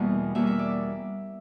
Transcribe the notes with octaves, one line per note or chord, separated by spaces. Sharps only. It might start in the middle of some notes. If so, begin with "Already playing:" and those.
Already playing: E2 B2 G3 A#3 E5
E2 B2 G3 A#3 E5
E5
D5